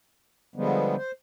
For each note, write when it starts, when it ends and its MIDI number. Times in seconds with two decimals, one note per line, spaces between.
0.56 0.96 50
0.56 0.96 53
0.56 0.96 55
0.56 0.96 56
0.56 0.96 59
0.97 1.11 72